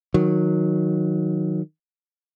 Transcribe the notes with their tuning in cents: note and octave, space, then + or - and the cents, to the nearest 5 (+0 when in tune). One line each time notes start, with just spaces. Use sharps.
D#3 +0 F#3 -20